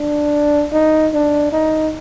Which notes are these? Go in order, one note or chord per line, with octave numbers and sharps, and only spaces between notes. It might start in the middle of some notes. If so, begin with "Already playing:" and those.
Already playing: D4
D#4
D4
D#4